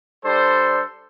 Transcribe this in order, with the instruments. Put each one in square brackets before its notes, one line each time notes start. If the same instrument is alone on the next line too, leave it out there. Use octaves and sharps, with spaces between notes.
[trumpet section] G3 D4 A4 C5